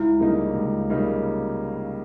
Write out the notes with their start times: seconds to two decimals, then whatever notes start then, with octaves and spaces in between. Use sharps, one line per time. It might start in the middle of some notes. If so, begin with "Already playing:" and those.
Already playing: C#2 E4
0.19 C#3 G3 A#3 D#4
0.54 C#2
0.90 C#3 G3 A#3 D#4